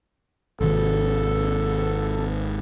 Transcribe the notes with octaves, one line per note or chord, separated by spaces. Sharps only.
G#1 C3 D#3 A4